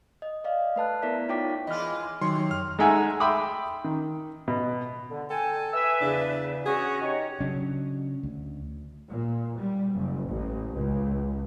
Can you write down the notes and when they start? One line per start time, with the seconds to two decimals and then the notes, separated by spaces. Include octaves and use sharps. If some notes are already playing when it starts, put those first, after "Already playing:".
0.22 D#5
0.44 D5 D#5 F5
0.76 A3 B4 A5 F#6
1.02 B3 E4 A#4 D5 E5 B6
1.29 D#4 F4 C#5 G5 D6 B6
1.67 E3 G#3 F4 D#5 F6
2.21 C3 D#3 F#3 D#4 C#5 C6
2.51 F#2 F6
2.79 G#3 A3 D#4 E5 F#5 G#5
3.20 E5 G5 B5 C6 D6 D#6
3.84 D#3
4.48 B2
5.10 D3
5.30 A4 G5 G#5
5.72 B4 E5 G#5 E6
6.01 E2 C#3 D4
6.66 C#4 F#4 G#4 F#5
7.01 D#4 G4 C#5
7.40 C#3 F#3 C#4 D4
8.23 D2
9.09 A#2
9.58 G3
9.93 F#1
10.28 A1
10.75 C#2